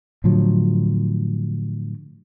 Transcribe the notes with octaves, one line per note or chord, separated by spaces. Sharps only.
A2 D3 F3 F#3